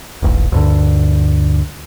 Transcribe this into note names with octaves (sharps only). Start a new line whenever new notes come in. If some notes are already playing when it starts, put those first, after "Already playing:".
D#1 A1
D2 G2 D3